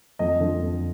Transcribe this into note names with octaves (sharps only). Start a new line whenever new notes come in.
F2 D#5
D3 F3
F2